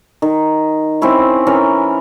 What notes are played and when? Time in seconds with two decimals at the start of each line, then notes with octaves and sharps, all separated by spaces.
0.22 D#3
1.02 C4 C#4 E4 C#5
1.47 E3 C#4 A#4